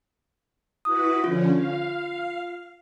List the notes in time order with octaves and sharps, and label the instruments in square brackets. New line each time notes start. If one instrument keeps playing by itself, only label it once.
[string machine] E4 F#4 B4 [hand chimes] D#6
[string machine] D3 F3 C#4 [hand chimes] F4
[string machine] F5